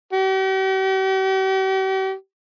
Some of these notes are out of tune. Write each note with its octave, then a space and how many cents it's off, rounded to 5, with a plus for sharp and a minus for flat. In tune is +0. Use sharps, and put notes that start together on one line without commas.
G4 -45